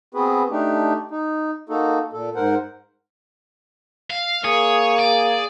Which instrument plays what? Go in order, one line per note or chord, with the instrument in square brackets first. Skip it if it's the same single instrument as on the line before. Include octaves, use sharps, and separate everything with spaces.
[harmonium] B3 C4 F#4 G#4 B4
A3 D4 D#4 G4
D#4
A#3 D#4 F#4 A4
A#2 A4
G#2 A#4 C5 F#5
[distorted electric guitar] F5
[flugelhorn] A#3 [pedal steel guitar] G#4 [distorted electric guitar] C#5
[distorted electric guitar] D5